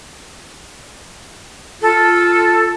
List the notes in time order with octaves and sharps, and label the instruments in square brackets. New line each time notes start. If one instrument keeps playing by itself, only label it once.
[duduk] F4 [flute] A4